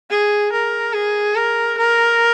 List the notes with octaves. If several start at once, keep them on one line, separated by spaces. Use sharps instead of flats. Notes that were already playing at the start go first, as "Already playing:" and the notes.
G#4
A#4
G#4
A#4
A#4